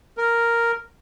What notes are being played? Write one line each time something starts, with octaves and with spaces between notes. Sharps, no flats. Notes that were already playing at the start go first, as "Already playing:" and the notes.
A#4